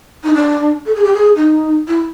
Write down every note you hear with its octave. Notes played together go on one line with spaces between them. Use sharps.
D#4
D4
A4
G#4
G4
G#4
D#4
E4